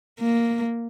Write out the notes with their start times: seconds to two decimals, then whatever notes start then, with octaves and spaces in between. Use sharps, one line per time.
0.20 A#3